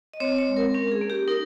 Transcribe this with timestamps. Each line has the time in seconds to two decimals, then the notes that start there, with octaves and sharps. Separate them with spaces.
0.14 D#5
0.20 C4 C#5
0.38 C#5
0.47 G#3
0.57 A#4
0.74 C#4 A#4
0.92 G#4
1.01 A#3
1.10 G4
1.28 D#4 A#4